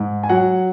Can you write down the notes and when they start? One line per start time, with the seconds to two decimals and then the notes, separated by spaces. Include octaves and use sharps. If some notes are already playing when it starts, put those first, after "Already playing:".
Already playing: G#2
0.23 G#5
0.29 F#3 F#5